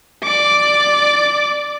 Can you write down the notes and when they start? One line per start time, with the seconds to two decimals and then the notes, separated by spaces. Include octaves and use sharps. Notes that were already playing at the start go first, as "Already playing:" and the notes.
0.24 D5 D6